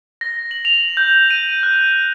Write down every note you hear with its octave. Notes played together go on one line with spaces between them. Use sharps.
A#6
F#7
F7
G6
D#7
F#6